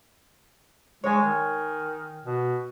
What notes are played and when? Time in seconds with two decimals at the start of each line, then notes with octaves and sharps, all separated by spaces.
1.04 G#3 C#5 G#5
1.23 D#3
2.25 B2